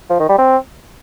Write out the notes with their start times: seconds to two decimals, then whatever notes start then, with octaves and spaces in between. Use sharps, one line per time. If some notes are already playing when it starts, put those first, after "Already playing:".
0.10 F3
0.20 D#3
0.29 G3
0.39 C4